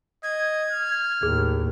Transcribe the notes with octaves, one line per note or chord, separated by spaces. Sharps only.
D#5 G#6
F6
D#2 A2 G#4